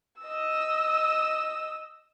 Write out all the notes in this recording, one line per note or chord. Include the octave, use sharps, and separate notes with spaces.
D#5 E6